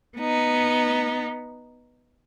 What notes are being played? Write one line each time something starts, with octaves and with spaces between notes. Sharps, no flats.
B3 D#4